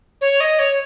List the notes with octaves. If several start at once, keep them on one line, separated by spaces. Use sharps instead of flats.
C#5
D#5
C#5